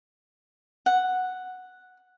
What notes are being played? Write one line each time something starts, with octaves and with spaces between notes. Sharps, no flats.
F#5